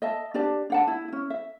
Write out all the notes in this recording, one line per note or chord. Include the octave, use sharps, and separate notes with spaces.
D#5 E5 A5
D4 G4 D5 A5
D4 F#5 A5
E4
C#4 E4
E5